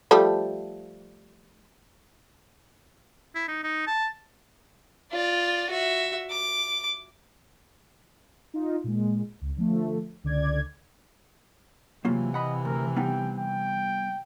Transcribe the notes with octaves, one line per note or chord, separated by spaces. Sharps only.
F3 G3 A3
E4
D#4
D#4
A5
F4 D5
F#4 E5
D6
D#4 F4
A#2 G#3
C#2
D3 F3 A3
C#2 D3 D5 G#6
C3 E3 F#3 A#3 F4
D#5 F#5 B5
D2 A#4
G3 B3 D#4 G5
G5